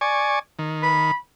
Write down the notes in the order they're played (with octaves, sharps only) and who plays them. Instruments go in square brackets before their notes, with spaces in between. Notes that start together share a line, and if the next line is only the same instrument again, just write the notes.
[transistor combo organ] D5 G#5 C#6
D#3
[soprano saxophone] B5